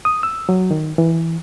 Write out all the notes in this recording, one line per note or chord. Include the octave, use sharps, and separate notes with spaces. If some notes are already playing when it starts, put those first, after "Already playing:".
D#6
E6
F#3
D#3
E3